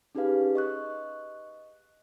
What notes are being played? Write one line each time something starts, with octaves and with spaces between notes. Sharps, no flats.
C#4 D#4 G4 G#4 B4 F5
D#5 C#6 F#6